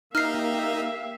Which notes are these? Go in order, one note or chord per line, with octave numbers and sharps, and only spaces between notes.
A#3 D#4 G4 E5 F5 F6 C7